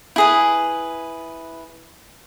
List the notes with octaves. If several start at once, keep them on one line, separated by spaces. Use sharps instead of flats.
E4 G#4 B4